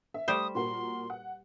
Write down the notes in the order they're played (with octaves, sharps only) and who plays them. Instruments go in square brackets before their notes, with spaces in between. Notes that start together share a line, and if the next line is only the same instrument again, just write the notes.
[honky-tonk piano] E5
[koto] G3 C5 [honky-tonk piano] A3 [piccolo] D#6
[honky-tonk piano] A#2 F#4 A#4 [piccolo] C6
[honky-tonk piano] F#5